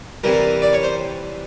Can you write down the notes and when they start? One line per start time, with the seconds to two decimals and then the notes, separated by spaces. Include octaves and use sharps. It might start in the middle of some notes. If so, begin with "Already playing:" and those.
0.24 C3 E3 G3 A#4
0.62 D5
0.73 C#5
0.83 C5